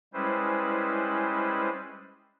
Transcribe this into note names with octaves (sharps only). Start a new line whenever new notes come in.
G3 G#3 C#4 E4 B4 C5